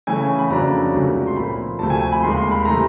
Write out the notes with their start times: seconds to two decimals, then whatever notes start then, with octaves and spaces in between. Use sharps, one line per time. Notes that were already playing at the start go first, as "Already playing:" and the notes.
0.07 C#3 E3 A3 C#4 G#5
0.39 B5
0.50 F2 C#3 F#3 A#3 D4 A#5
0.93 C#2 C3 D#3 F#3 A3
1.27 C6
1.36 A#2 F3 A#3 B5
1.79 D2 C3 F3 A3 A5
1.90 G#5
2.00 G#5
2.12 B5
2.22 D#2 D#3 G#3 C6
2.37 C6
2.51 B5
2.65 C3 E3 A3 A#5